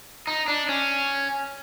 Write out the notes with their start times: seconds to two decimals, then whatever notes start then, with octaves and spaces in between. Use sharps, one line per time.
0.27 D#4
0.48 D4
0.69 C#4